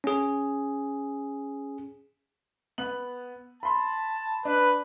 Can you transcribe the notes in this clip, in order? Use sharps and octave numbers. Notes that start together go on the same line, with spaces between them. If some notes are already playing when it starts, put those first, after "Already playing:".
C#4 G#4
B3 F#7
A5 B5 C6
D4 B4